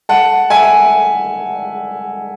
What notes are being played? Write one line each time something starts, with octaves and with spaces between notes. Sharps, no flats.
F#5 A5
E5 G#5